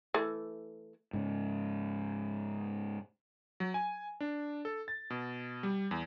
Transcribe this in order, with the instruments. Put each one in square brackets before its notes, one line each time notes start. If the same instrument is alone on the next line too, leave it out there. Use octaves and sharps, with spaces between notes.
[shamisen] E3 A3
[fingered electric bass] G#2 C#3
[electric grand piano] F#3
G#5
D4
A4
A6
B2
G3
E2